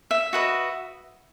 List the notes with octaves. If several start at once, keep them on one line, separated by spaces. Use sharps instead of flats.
E5
F#4 B4 D#5